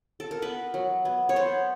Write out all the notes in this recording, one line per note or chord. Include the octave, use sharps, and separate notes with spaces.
A4
A#4
B3 B4
F#3
B3
C#5
B3 C5